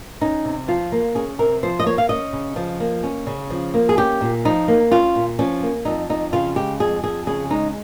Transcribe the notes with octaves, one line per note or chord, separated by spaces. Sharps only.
C#4 D#4
C3
F3 F4
A#3
C#4 G#4
C3 A#4
F3 C5
D#5
A#3 C#5
F5
C#4 D#5
C#3
F3
A#3
C#4
C#3
F3
A#3
G#4
C#4 G4
A#2
F3 D#4
A#3
C#4 F4
A#2
F3 C#4
A#3
F2 D#4
F2 D#4
C#3 F4
G#3 G4
F2 G#4
F2 G#4
C#3 G#4
G#3 D#4